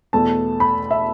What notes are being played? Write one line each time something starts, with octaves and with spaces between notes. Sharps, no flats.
E2 B2 A3 A5
B5
E5